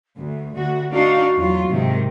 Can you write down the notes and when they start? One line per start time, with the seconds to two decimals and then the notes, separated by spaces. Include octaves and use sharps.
0.19 D2 A3
0.55 D2 F#4
0.92 D4 D#4 F#4 F5
1.36 E2 F#3 F4
1.69 G#2 C3 D#3